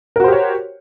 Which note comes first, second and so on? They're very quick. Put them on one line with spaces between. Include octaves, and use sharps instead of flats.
A#4 F#4 C5 G4 C#5